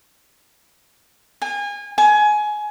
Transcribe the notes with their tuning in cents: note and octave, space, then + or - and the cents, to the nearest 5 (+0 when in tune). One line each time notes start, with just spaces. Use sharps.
G#5 -30
G#5 +20